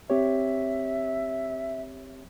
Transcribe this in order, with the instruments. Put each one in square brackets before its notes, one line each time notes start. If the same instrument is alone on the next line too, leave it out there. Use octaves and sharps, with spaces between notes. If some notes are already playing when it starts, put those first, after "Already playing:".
[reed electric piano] C4 G4 C#5 [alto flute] E5